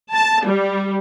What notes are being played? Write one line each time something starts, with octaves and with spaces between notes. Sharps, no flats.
A5
G3